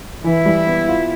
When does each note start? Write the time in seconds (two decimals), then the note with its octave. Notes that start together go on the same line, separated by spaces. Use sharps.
0.24 E3 E4
0.46 G3
0.66 B3
0.88 F4